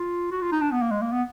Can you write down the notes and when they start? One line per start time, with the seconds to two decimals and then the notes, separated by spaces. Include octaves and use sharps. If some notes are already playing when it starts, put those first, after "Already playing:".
Already playing: F4
0.31 F#4
0.42 F4
0.52 D#4
0.61 D4
0.71 B3
0.82 A#3
0.91 G#3
1.02 A#3
1.12 B3